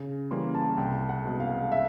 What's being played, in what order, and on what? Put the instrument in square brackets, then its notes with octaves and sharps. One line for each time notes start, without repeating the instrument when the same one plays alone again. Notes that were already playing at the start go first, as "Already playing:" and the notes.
Already playing: [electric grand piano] C#3
[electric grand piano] E3 G3 A#3 C#4 [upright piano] C6
[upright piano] A5
[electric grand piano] C2 [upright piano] G5
[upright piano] F#5
[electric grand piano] B2 G#3
[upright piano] F5
E5